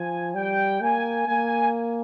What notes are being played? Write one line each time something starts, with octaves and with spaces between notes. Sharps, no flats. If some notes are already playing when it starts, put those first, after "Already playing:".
Already playing: F3 G#5
G3 G5
A#3 G#5
A#3 G#5